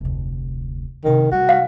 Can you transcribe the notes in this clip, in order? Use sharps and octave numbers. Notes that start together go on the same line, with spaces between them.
F1 D2
G2 C3 D#3
G3 A3 F#4
F5